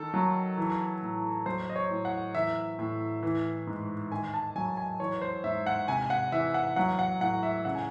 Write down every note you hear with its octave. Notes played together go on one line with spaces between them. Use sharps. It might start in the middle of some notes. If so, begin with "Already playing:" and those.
Already playing: D#3 A4
F#3
E3
A2
F#3 C5
D#5
C#5
A2
F#5
E3 E5
A2
E3
G#2
D#3 G#5
A5
F#3 G#5
G#5
E3 C#5
C5
G#2 E5
F#5
C3 G#5
F#5
E3 E5
F#5
F#3 F#5
F#5
A2 F#5
E5
C#3 F#5
G#5